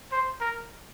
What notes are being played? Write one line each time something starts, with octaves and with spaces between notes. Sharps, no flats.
C5
A#4